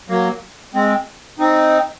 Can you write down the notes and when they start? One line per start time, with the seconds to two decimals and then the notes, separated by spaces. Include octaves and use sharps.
0.09 F#3 A#3
0.74 G#3 C4
1.39 C4 D#4